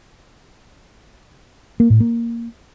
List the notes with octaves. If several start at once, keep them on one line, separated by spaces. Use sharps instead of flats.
A#3
A2
A#3